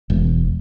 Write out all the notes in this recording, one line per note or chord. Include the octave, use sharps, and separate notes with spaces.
E1